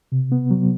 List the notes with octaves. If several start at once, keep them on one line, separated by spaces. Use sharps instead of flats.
C3
B3
F#3